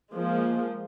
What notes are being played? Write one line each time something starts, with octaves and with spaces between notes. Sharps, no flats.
F3 G#3 A#3